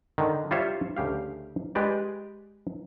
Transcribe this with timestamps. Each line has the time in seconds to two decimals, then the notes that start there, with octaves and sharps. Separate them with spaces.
0.18 D3 D#3
0.51 G3 F4 C5 C#5 E5
0.96 D2 C#3 G4 F5
1.75 G#3 G4 B4 D5